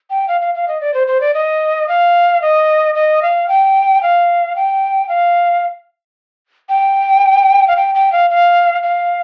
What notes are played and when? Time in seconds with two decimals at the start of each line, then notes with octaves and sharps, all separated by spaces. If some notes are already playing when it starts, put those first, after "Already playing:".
0.10 G5
0.28 F5
0.41 F5
0.55 F5
0.68 D#5
0.81 D5
0.94 C5
1.08 C5
1.21 D5
1.34 D#5
1.89 F5
2.42 D#5
2.95 D#5
3.22 F5
3.48 G5
4.03 F5
4.56 G5
5.09 F5
6.69 G5
7.68 F5
7.76 G5
7.95 G5
8.12 F5
8.30 F5
8.83 F5